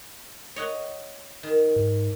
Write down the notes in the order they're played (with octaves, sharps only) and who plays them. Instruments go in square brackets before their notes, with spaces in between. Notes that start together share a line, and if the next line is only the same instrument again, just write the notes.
[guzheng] C#5 D#5 F#5
D#3
[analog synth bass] G#2